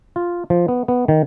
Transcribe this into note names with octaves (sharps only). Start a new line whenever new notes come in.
F4
F3
B3
B3
D#3